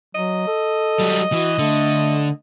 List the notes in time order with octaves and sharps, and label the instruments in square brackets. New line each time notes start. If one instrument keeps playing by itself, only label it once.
[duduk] F#3 [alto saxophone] D#5
[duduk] A4
[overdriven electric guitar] F#3 G3
[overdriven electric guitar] E3 [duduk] F#4
[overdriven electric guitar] D3 [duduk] A3